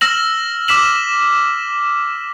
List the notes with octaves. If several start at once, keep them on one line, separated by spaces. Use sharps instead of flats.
E6 F6 A#6 E7 F#7
D6 F6 B6 E7 F#7